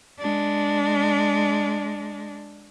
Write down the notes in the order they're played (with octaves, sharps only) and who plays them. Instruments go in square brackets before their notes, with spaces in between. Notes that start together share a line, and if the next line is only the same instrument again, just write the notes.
[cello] G#3 D4